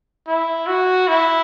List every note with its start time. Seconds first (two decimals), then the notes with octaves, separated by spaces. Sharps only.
0.27 E4
0.67 F#4
1.08 E4